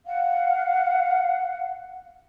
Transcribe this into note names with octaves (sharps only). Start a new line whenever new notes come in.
F5 F#5